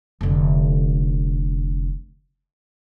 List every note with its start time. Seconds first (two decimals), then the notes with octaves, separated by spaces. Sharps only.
0.21 F1 D3